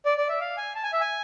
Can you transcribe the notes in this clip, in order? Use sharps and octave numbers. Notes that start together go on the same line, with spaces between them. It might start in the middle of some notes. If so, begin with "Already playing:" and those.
D5
D5
E5
F5
G#5
A5
G#5
E5
G#5